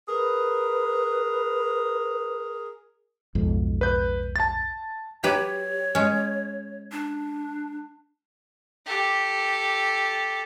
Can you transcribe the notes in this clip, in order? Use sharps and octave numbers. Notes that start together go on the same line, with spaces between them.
G#4 A#4 B4
B1 F2 G#2
B4 G6
A5 A6
F#3 G4 B4 C#5
G#3 C#4
D4
G4 A4